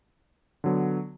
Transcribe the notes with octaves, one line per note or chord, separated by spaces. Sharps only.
D3 F#3 B3